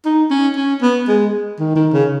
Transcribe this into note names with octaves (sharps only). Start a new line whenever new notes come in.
D#4
C#4
C#4
B3
G#3
D#3
D#3
C#3